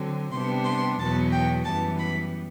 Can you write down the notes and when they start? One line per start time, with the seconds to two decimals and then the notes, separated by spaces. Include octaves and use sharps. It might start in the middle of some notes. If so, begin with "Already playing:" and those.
Already playing: D3 F#3 C4
0.32 C3 G3 B3 D4 C6
0.65 C6
0.99 E2 B2 F#3 B3 A5
1.32 G5
1.65 F#2 E3 G3 B3 A5
2.00 B5